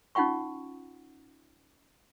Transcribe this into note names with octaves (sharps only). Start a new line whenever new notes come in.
C#4 D#4 F4 F#5 G5 C#6